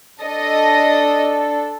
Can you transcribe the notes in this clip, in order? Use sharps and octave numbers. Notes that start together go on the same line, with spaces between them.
D4 A4 D#5